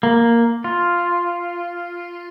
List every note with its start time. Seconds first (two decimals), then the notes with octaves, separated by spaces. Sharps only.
0.03 A#3
0.64 F4